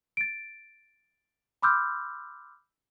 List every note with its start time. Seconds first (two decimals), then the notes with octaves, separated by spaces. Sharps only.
0.17 A6 D7
1.62 B5 C6 D6 E6 F6 G6